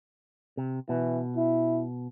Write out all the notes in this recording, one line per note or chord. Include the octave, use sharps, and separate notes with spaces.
C3
B2 E3
E4